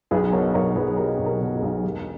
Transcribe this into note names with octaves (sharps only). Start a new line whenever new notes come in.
B1 G#4 B4
B2 A#4 C#5
B1 A#4 C#5
B1 G#4 B4
B2 G4 A#4
B1
G4 A#4
B2
G#4
B1
E1 G4